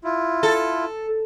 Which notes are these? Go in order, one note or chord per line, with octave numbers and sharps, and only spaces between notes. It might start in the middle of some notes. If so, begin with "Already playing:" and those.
E4 F4
A4